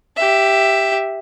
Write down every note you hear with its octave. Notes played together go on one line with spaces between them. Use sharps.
G4 E5